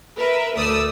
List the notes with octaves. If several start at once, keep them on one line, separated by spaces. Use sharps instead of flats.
A#4 B4 E5
D2 A3 D5 D#6 E6